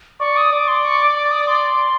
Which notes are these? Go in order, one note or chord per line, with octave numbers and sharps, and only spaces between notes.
D5 C#6
D#6
D5 D6
C6
C#6
D6
D6
D#6
C6